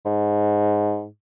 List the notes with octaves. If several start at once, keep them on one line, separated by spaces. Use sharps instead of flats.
G#2